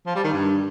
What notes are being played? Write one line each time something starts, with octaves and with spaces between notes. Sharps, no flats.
F3
G3
D#3
G2